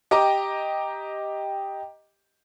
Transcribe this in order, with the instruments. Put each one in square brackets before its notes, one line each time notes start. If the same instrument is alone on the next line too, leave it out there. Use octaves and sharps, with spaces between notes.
[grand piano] G4 D#5 G5 A#5 D6